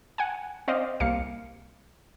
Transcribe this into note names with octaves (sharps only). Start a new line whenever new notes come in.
F#5 G#5
C4 C5 D5 D#5 F5
C2 A#3 F5 C#7